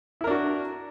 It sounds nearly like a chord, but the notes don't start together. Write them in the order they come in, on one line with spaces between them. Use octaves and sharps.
E4 A#4 D4 F#4